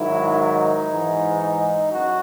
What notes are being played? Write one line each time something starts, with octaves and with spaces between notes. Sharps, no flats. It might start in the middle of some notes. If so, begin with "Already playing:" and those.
Already playing: G#2 D#3 F#3 E4
D#4
G#2 E3
D#4
F#2 F#4